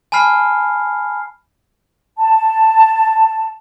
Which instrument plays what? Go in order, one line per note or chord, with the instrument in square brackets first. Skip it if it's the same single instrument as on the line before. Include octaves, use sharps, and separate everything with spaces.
[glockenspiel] G#5 A5 B5 F6 C7
[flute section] A5